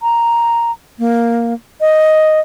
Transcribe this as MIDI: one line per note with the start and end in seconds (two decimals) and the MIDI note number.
0.02 0.71 82
0.99 1.54 58
1.81 2.40 75